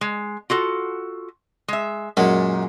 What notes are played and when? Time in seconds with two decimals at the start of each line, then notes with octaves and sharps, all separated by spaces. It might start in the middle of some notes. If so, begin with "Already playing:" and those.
0.01 G#3
0.50 F4 F#4 A4
1.68 G#3 E5
2.17 F#2 A#2 G#3